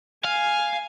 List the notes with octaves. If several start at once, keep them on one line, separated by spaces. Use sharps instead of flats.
F5 G#5